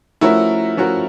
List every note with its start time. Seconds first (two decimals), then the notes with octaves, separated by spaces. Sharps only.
0.21 F3 A3 C#4 E4 F#4 A#4
0.77 F3 A3 C#4 F#4 A#4